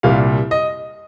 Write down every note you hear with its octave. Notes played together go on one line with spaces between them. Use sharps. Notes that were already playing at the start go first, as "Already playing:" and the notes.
C2 A#2 G3 F5
D#5